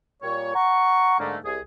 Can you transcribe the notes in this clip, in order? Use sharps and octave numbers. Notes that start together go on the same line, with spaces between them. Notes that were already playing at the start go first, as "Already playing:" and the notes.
A#2 G3 C#5
F#5 A#5 C#6
G#2 D3 A3 A#3
C2 G#4